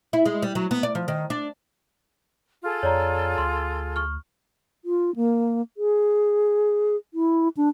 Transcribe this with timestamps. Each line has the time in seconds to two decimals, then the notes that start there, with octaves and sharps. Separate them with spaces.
0.13 E4
0.26 G#3
0.42 G3
0.55 F#3
0.71 B3
0.83 D5
0.95 F3
1.08 D#3
1.30 D4
2.63 F4 G#4 A4
2.83 F2 C#5 D5 A#5
3.38 D2 C6
3.96 C#6 F6
4.84 F4
5.16 A#3
5.77 G#4
7.14 E4
7.57 D4